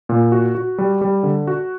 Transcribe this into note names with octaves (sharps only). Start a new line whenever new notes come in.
A#2
F#4
F#4
G3
G3
D3
F#4